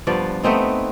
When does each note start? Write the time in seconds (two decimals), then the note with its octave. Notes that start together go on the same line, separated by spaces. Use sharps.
0.07 G2 F3 B3 D5
0.43 A3 B3 C4 D#4